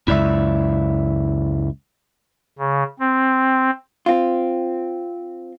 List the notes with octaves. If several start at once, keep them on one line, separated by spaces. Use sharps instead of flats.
C#2 F#2 E4 D5 E5
C#3
C4
C4 F4